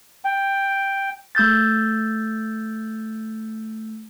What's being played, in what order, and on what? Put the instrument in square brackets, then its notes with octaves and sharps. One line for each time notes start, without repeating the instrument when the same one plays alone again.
[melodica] G5
[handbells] A3 E6 G6 A6